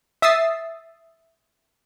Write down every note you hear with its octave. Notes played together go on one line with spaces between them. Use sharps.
E5 D#6 E6 A6 C7